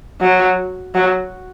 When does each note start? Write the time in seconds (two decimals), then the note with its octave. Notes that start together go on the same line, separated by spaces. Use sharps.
0.21 F#3
0.94 F#3